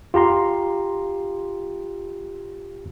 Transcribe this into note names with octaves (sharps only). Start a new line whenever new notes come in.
F4 G4 A#5 C6